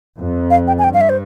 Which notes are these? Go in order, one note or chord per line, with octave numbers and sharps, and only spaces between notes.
F2
F5
G5
G#5
G2 G5
F5
E5
C5